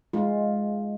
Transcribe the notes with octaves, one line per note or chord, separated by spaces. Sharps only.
G#3 F4